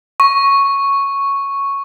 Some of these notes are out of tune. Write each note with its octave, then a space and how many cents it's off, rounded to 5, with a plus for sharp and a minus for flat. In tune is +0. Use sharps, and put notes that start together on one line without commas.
C#6 +0